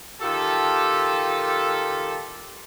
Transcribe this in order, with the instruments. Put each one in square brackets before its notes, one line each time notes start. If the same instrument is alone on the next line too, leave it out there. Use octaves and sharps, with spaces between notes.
[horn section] D#3 F4 G4 A4